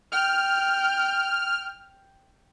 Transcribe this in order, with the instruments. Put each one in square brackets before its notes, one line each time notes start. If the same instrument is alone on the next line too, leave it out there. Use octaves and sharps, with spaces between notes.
[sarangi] G5 [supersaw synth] F6